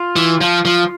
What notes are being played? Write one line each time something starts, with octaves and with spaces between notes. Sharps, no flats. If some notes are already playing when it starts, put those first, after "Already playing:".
Already playing: F4
E3
F3
F3